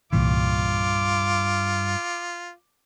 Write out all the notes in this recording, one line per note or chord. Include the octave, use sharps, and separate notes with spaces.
C2 G2 A#2 E3 F4 D6